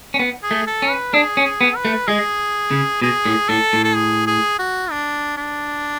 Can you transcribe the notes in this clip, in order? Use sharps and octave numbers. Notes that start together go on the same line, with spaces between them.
C#4
B3
G#4
A3
A4
C#4
B4
D4 G#4
C#4
G#4
B3
B4
A3
G#3 G#4
C#3
B2 G#4
A2
A2 A4
A2
A4
G#4
G#4
F#4
D4
D4